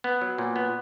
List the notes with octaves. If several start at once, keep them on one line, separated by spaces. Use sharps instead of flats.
B3
F#3
A#2
B3